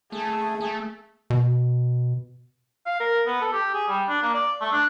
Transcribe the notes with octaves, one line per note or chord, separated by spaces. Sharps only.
A3 G#4 A5
A3
B2
F5
A#4
B3
A4
G4
G#4
G3
D4
A#3
D5
A3
D4